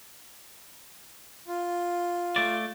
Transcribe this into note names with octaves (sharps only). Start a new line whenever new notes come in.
F4
A3 D5